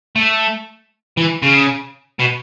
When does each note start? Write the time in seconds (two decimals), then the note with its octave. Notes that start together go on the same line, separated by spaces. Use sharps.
0.16 A3
1.17 E3
1.43 C#3
2.19 B2